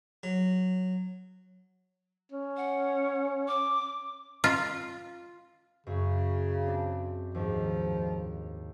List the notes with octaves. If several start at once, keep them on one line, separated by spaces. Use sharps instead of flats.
F#3
C#4
F#5
D6
F4
F#2 C#3 C#4
C4 D4
D#2 G#2 F3